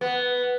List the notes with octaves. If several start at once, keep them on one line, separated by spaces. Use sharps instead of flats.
B3